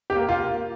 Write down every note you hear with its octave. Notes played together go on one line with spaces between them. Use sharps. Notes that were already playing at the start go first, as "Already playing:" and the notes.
G4
A#3
F4